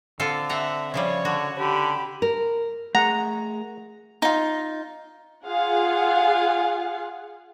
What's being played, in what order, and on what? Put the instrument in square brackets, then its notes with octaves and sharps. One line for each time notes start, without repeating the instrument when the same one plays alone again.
[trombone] D3 [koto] C4 F4 A4
[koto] C4 F#5 A#5 [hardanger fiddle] E5
[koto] C#3 F3 G3 [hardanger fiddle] C#5
[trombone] D3 [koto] F#4
[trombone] D3 [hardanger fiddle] G4 B5
[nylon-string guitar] A#4
[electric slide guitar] A3 G#4 A#4 [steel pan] F#5 [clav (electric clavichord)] A#5
[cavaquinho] D#4 F4
[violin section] F4 G#4 F5 F#5